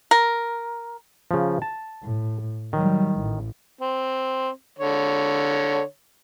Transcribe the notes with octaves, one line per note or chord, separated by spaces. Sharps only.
A#4
C#3 F3
A5
A2
D#3 F#3 G3
A1 A2
C4
D3 C#5